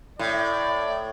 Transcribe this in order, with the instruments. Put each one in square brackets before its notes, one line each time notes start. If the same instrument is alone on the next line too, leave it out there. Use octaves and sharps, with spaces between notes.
[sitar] A2 [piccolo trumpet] D5